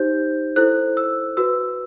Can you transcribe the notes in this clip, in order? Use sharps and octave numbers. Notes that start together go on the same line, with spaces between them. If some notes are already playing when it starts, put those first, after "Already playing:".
Already playing: D#4 G4 C5 G6
E4 A4 C5 F#6
E6
F#4 B4 E6